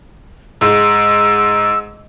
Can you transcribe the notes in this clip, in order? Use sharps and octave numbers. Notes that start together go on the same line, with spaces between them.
G#2 E6